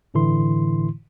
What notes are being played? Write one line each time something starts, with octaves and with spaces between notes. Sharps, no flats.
G1 A2 D3 E3 E4 C6